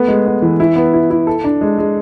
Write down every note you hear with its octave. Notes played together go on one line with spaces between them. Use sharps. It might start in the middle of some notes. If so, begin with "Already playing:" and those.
Already playing: A3 B3
G#3
B3
E3
E4
B3
E4
E4
A4
D4
G#3
G#3